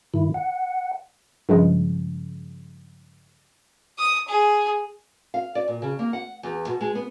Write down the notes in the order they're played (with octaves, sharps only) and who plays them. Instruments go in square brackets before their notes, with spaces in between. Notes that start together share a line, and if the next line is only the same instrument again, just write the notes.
[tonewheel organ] G2 D#3 E4
F#5
[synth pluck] G2 C#3 F3 G#3
[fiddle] D#6
G#4
[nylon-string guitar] F5
D5
A#2
C#3
A#3
F#5
E2
B2
G#3
B3